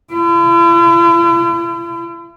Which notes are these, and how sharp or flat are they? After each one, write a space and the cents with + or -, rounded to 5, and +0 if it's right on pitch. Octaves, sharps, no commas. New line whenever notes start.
E4 +45